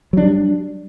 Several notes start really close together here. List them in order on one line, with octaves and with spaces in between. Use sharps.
F#3 D4 G3